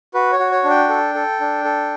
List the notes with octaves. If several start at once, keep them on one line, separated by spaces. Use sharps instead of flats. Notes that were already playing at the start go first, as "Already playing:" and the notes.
F#4 B4
C#5
F#4
C#5
D4
G5
A4
A4
D4
A4